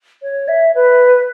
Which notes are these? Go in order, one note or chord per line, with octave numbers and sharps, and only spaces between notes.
C#5
E5
B4